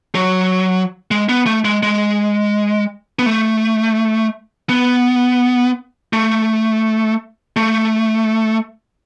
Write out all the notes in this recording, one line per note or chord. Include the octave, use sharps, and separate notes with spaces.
F#3
G#3
B3
A3
G#3
G#3
B3
A3
B3
A3
A3